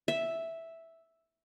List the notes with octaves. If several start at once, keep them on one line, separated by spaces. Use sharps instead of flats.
E5